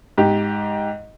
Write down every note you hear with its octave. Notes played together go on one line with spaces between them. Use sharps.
G#2 G4